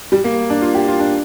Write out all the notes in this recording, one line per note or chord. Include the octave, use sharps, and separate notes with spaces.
G3
A#3
D4
F4
G4
F4
D4